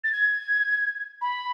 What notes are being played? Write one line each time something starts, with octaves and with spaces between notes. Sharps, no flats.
A6
G#6
B5